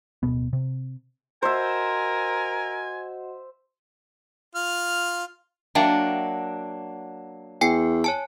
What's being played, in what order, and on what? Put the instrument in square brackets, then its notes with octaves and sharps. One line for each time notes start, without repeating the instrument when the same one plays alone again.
[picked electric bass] D1 B2 B3
C3
[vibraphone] F#4 D#5 F#5 [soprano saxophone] A#4 [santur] C5 E5 [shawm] G#5
[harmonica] F4 F6
[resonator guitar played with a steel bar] F#3 A#3 D4 [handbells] E5 G5
[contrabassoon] E2 [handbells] G5 G#5 C7
[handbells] C#5 G#5 A5